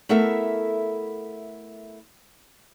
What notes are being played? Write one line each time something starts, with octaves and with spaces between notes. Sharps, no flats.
A3 B3 E4 A4 A#4 E5